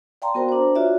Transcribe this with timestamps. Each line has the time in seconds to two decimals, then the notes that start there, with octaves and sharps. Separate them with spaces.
0.22 D5 F5 G5 A5 A#5 C6
0.34 B3 F#4 A#4 C5 A#5
0.49 D4 C5
0.75 F4 F#4 C#5 D5 E5